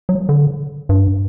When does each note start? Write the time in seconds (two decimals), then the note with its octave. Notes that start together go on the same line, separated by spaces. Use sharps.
0.09 F#3
0.29 D3
0.89 G2